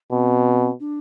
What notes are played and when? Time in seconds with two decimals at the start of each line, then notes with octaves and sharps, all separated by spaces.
0.12 B2 C4
0.80 D4